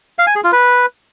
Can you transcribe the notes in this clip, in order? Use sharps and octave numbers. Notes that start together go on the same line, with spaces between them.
F5
G#5
G#4
F4
B4